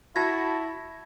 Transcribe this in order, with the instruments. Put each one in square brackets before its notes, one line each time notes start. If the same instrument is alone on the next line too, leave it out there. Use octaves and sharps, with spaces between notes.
[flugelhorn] E4 [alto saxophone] F#4 [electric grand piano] A5 B5 A#6 [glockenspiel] G#6